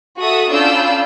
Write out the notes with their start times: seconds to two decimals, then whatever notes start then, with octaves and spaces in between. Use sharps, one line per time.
0.21 F#4 A4 E5 D#6
0.50 C#4 D4 F4 B5 E6 G6